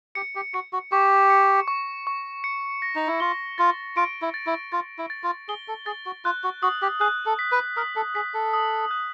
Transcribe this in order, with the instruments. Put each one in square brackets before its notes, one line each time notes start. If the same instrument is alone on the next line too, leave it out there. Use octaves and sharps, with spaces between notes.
[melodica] G4 [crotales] C#7
[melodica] G4
[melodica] F#4 [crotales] C#7
[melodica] F#4
[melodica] G4 [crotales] C#6
[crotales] C#7
C#6
C#6
C#7
A#6
[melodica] D#4
E4
[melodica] F4 [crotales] G7
[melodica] F4 [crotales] A6
[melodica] F4 [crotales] D7
[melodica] E4
[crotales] A6
[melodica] E4
[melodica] F4 [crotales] A6
[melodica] E4
[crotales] A6
[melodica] F4
[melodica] G#4 [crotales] G7
[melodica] A4
[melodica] G#4 [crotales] A6
[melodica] F#4
[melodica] F4 [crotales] F#6
[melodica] F#4
[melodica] F#4 [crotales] D#6
[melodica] G4
[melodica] G#4 [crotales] F#6
[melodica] A4
[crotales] B6
[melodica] B4
[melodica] A#4 [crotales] D#6
[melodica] A4
[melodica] G#4 [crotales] B6
[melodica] A4
[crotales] D#6
F#6